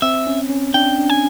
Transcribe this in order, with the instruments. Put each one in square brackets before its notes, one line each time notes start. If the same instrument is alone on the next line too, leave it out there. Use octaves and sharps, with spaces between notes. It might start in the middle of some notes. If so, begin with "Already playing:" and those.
[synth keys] C4 [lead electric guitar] E5
[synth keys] C#4
C#4
[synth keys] D4 [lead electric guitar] G5
[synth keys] D4
[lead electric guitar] G#5